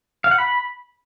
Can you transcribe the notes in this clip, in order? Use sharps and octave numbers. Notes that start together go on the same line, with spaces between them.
F5
F#5
B5